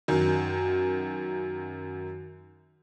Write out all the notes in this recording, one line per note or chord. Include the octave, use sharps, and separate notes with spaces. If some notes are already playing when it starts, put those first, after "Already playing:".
F#2 D#3